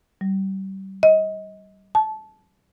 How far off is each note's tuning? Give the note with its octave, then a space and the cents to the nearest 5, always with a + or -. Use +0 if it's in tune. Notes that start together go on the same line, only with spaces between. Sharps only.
G3 -30
D#5 +25
A5 -20